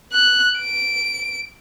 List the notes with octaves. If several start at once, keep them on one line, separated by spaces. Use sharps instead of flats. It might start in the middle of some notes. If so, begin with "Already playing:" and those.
F#6
D7